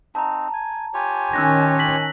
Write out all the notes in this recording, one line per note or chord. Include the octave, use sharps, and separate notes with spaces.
C4 D#4 A5 A#5
G#5
F4 G4 C#5 G#5
D#3 C#4 E6 F#6 A#6
B6 F#7